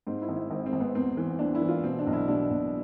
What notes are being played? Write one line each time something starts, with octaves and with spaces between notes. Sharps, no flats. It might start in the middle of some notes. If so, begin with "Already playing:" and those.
G#2 C4
E4
G#1
E4
G#1 C4
C4
G#1
B3
E2 C4
E3
C4
E2 D4
E4
E3
F4
B2 C4
D4
B1
E4
B2 D4
B1